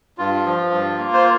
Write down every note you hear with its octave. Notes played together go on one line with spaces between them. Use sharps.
G2 F4
F3
G2
A#3
C5